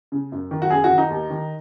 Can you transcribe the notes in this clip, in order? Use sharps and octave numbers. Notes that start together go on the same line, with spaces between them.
C#3
F#2
D#3
F#4
F#2 G#4
F#4
D#3
D#4
D#2
D#3